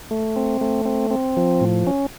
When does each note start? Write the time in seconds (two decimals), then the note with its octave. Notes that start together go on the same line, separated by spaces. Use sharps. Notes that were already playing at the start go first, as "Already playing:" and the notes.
0.11 A3
0.36 C4
0.61 A3
0.85 C4
1.11 C4
1.37 F3
1.61 A2
1.87 C#4